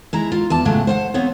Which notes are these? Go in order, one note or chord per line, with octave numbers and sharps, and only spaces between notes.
G#3 E4 A#5
F4
E2 D5 A5
A2 C#3 F#3 G#3 A3
C5 F5 F#5
F3 B3 C4 C#5